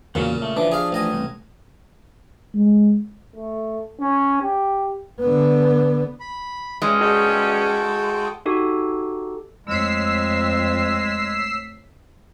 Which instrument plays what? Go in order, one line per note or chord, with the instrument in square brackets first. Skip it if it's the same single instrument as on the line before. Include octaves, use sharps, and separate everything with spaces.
[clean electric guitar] E2 F#3 A#3 [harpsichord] A#2 C#3
[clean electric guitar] A3
[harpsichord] E3 [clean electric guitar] F3 D4
[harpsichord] G#4 F5
A1 D#5 G#5
[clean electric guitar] C2
[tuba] G#3
[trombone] A3
C#4
G4
[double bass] D3 B3
[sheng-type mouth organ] B5
[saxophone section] B2 G3 C#4 [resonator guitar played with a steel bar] G#3
[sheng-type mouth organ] F#4 A4 G5 [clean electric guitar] G#4 D#5
[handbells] D#4 F#4 G4 A4
[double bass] F2 [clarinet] G#3 [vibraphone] A3 C#5 [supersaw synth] E6 B6 C7